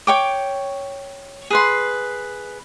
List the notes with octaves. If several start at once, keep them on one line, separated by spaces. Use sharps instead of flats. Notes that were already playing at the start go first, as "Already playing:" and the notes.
C#5 G5 D6
G#4 B4 C6